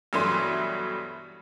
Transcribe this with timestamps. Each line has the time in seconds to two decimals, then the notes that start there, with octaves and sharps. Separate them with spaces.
0.13 G2 B2 E3 F#3 A3 C6